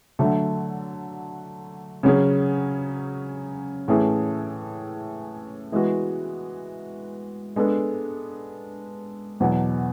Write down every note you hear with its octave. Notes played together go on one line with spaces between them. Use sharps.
D3 F#3 A3
C#3 F#3 C#4 G#4
A2 E3 A3 C#4 G#4
E3 G#3 B3 F#4
G#3 B3 D4 A4
E2 B2 F#3